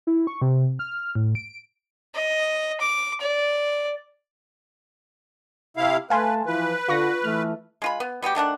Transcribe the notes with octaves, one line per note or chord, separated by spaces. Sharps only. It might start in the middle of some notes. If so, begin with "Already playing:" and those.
E4
C#6
C3
F6
A2
D7
D#5
D6
D5
C3 E4 F5
A3 B4 F5 G#5 A5 C6
E3 F3 B4
D3 F4 C#6 A#6
E3 A3 F6
G#3 F4 B5
B3
G3 B3 F#4 G4
D#3 A3 D4 F#5